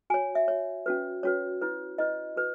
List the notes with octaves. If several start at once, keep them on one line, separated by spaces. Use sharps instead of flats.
F#4 C#5 G#5
E5
F#4 C#5
C#4 F#4 B4
C#4 F#4 B4 C#5
E4 B4
E4 B4 D#5
F#4 B4